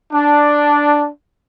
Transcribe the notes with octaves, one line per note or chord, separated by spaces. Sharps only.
D4